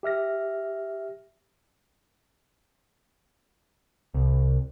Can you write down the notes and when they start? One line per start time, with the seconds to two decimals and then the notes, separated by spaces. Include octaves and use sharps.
0.03 G4 E5 F6 A#6
4.14 C2